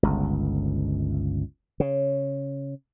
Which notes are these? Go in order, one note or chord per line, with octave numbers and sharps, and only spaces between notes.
G1 C#2
C#3